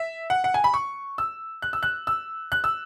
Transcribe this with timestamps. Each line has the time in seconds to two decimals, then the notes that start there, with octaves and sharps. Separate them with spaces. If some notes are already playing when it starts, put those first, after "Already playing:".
Already playing: E5
0.30 F#5
0.44 F#5
0.54 G#5
0.64 B5
0.74 C#6
1.18 E6
1.62 F#6
1.73 E6
1.83 F#6
2.07 E6
2.52 F#6
2.64 E6